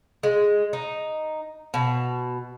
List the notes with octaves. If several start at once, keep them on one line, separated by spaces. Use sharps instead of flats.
G#3
D#4
B2